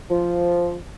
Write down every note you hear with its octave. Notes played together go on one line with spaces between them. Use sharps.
F3